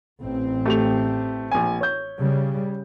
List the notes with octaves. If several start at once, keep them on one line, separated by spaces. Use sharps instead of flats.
A1 C4
A3 G4 F7
A#1 G#5
C#5 G6
C#3 G3